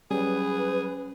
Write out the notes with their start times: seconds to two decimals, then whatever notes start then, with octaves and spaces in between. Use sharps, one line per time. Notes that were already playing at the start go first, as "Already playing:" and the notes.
0.11 F#3 G3 C#4 G#4 B4